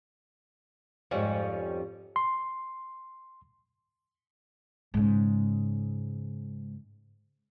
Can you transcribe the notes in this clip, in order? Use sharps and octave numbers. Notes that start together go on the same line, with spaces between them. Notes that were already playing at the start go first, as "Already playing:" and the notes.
F2 G#2 F3 G3 C#4
C6
G#2 C#3